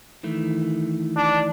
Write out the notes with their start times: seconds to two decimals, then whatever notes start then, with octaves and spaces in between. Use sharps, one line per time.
0.23 D#3 E3 A3
1.16 D4